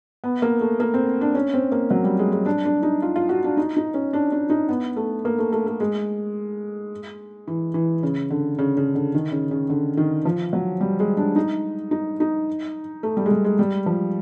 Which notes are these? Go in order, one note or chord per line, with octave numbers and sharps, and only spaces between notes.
B3
A#3
A3
A#3
C4
D4
C#4
C4
A#3
F#3
G3
G#3
G#3
D4
D4
D#4
F4
F4
F#4
D4
D#4
D#4
C#4
D4
D4
D#4
B3
A3
A#3
A3
A3
A3
G#3
E3
E3
C#3
D3
C#3
C#3
D3
D#3
C#3
C#3
D3
D#3
F3
F#3
G3
G#3
D4
D#4
D#4
D#4
A3
G3
G#3
G3
G#3
G3
F3